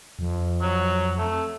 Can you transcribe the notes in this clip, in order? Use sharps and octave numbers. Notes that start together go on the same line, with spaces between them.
F2
F#3
A3